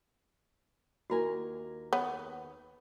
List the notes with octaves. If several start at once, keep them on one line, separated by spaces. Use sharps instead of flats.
D#2 E4 F#4 A#4 G#5
B3 C#5